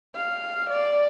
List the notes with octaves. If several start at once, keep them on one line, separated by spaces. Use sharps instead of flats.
F5
D5